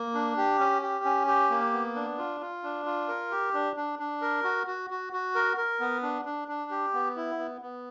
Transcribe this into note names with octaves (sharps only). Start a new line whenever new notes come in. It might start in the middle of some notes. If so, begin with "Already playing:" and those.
Already playing: A#3
D4
G4
C#4
G4
C#4
G4
A#3
B3
D4
F4
F4
D4
F4
A#4
G4
D4
D4
D4
A#4
F#4
F#4
F#4
F#4
A#4
A#4
B3
D4
D4
D4
G4
B3
E4
B3
B3